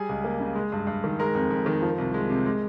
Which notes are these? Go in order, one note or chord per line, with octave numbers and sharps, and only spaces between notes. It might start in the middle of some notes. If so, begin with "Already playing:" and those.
Already playing: G3 G#4 G#5
C#2
A#3
C#3
G#3
G2
G2
D#3
G#3 A#4 A#5
F2
F2
D#3
F3
C2
G#3
C3
G#3